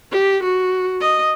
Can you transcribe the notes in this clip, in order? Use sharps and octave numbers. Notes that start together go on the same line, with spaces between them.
G4
F#4
D#5